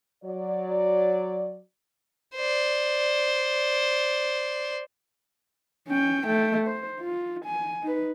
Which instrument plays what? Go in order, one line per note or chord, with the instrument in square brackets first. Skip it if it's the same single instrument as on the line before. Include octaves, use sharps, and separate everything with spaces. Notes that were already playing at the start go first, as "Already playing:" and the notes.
[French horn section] F#3 D5
[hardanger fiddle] C5 D5
[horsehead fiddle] C#4 G5
A3 G5
C5
F4
G#5
D#4 B4